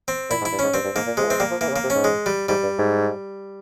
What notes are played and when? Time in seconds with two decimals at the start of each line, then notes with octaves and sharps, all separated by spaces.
0.08 C4
0.30 A#2 E4
0.41 G#2
0.45 E4
0.52 G2
0.59 G#2 C#4
0.74 G2 C4
0.84 G2
0.95 G#2 A#3
1.07 A#2
1.17 C3 G#3
1.24 F3
1.28 E3 C4
1.39 G3 A#3
1.51 F3
1.61 E3 A#3
1.68 C3
1.73 C#3
1.76 A#3
1.84 C3
1.90 G#2 C#4
2.04 G#3
2.26 G3
2.48 G#2 G3
2.63 G2
2.78 G#2